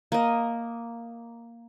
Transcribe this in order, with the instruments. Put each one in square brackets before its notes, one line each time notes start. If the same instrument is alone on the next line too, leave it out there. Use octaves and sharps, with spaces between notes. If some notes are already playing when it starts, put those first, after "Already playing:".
[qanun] A#3 D#5